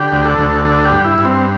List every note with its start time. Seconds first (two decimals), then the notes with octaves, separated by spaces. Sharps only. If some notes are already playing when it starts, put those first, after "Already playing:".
Already playing: D3 G4
0.12 D2
0.25 A4
0.38 D2
0.65 D3 A4
0.85 G4
0.92 G2
1.05 E4
1.18 G2
1.25 C4